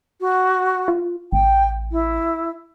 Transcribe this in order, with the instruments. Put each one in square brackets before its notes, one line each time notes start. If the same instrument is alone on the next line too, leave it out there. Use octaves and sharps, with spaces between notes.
[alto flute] F#4
[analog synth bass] F4
[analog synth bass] A1 [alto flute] G5
[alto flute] E4